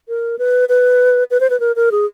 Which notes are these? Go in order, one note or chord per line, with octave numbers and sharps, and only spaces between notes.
A#4
B4
B4
B4
C5
B4
A#4
A#4
G#4